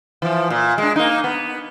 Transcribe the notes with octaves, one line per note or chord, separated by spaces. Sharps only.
E3 F3
A#2
G#3 D4
A#3 D#4
B3